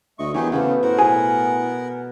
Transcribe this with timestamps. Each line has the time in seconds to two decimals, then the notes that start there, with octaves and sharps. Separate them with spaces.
0.19 D2 A3 D#5 C#6
0.34 E2 F#3 D#4 G4 G#4 A#4 C6
0.52 C#3 A3 B3 C5
0.83 A2 B3 A#4 C5 F#5
0.99 B2 G#4